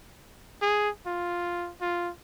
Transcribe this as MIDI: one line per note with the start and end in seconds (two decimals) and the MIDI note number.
0.62 0.89 68
1.07 1.71 65
1.81 2.11 65